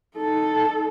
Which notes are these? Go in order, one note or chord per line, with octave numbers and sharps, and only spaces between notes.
D#4 A4